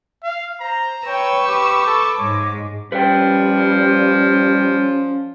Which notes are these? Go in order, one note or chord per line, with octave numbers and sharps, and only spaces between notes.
F5
C5 A#5
B4 C#5 G5 C#6 E6
G4 D6
A4
G#2 G#3 C#5
F3 G3 C#4 B4 G5